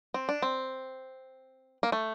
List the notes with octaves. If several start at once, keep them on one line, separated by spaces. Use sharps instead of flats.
C4
D4
C4
A#3
A3